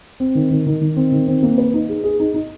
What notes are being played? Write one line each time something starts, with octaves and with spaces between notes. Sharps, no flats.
C4
D#3
D#3
D#3
D#3
C4
D#3
C4
A#3
B4
D#4
G#4
G#4
D#4
D#4